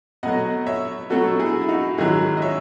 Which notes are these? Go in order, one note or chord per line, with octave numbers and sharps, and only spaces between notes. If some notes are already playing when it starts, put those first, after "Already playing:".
B2 F#3 A3 D#5 F#5
C#5 E5
B2 F#3 A3 F#4 A4
E4 G#4
E4
D#4 F#4
G#2 D#3 F#3 E4 G#4
D#5
C#5 E5